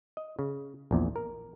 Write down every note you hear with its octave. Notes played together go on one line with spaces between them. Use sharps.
D#5
C#3
A#1 E2 A#2
A#4